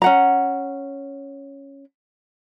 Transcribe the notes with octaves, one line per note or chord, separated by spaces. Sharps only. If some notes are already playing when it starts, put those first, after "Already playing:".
C#4 F#5 A#5